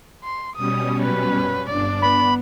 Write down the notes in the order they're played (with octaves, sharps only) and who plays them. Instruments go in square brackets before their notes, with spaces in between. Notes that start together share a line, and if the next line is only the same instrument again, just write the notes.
[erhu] C6
[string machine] B2 G3 C#4 [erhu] D#6
[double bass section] A#2 F#3 [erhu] B4
[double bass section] F#2 C#4
[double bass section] G1 [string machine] D4 [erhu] D5
[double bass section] B3 [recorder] B5